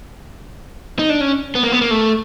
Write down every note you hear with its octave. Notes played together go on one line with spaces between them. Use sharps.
D#4
D4
C#4
B3
A#3
B3
A#3
A3